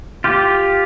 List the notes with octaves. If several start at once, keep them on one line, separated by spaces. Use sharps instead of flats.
F4 G4